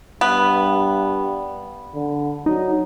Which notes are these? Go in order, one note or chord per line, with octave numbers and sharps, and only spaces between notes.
G2 B3
D3
F#3 D#4